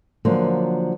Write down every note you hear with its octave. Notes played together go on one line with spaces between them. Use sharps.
D3 F3 F#3 A#3